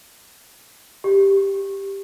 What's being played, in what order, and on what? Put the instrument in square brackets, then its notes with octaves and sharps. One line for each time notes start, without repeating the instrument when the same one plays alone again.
[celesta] G4